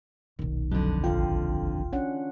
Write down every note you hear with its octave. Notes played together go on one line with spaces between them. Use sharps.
D#1 B1 D#3
F2 D3 F#3
A1 F4 F5 G5
C#4 D4 F#5